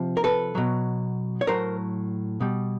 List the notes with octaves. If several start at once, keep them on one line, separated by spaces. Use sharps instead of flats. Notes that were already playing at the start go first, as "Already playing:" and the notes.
Already playing: C3 F3
A#4
A4 B4
B2 F#3
C#5
A2 F#3 A#4 C5
B2 G3